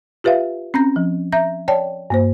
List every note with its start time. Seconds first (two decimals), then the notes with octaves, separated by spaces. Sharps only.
0.24 F4 G4 B4 E5 F5
0.74 C4 C#4 A#5 G6 A#6
0.96 F3
1.32 E5 A#5 G6 A#6
1.68 C#5 D5 G5 A5
2.10 G2 A#3 C5